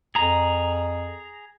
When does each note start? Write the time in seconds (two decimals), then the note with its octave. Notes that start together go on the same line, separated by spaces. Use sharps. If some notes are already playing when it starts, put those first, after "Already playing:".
0.15 F2 G#4 A#5